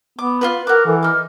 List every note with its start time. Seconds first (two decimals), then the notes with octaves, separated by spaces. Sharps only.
0.19 B3 D6
0.41 F4 F#4 B4
0.67 F#4 A#4 D6 F#6
0.86 E3 A4
1.03 D#4 D6 F6